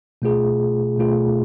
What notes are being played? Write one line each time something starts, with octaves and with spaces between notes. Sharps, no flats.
B2 A3 F4 G#4
B2 A3 F4 G#4